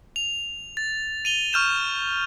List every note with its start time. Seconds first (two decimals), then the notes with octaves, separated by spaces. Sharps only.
0.16 F7
0.77 A6
1.25 D#7 F7 G7
1.53 C#6 F6 G6 E7